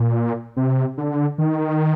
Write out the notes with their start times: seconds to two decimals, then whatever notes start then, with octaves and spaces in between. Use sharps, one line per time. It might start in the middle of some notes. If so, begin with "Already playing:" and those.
Already playing: A#2
0.57 C3
0.98 D3
1.38 D#3